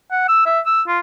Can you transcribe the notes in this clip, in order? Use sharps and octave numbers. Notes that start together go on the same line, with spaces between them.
F#5
E6
E5
E6
F4